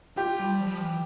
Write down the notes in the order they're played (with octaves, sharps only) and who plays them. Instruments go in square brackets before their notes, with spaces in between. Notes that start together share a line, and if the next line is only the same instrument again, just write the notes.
[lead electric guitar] F4 [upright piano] G4
[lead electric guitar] G3
F3
G3
F3
E3